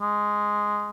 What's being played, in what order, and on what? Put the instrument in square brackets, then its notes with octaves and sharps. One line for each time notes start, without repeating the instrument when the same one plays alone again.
[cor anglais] G#3